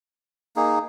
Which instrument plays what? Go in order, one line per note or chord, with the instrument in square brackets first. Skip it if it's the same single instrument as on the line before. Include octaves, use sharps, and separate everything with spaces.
[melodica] A#3 D#4 G#4